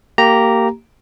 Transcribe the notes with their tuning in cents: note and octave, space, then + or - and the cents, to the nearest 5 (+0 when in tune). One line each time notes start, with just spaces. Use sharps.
A#3 -20 G4 -15 A#5 +0